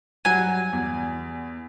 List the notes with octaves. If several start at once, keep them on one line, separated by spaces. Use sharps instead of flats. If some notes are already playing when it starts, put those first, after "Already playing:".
F#3 G3 G#5
E2